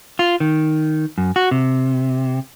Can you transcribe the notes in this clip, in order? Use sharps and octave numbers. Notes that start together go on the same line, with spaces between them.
F4
D#3
F#2
F#4
C3